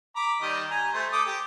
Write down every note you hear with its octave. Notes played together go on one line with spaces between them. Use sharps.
A#5 B5 D6
D#3 G3 D#5
G#5 A#5
A3 C5
A4 D6 D#6
G4